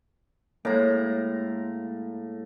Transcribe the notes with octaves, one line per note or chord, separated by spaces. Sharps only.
A2 G#3 A#3 A#5